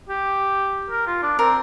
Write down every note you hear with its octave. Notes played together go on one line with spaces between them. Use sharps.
G4
A#4
F4
D4
C4 A#4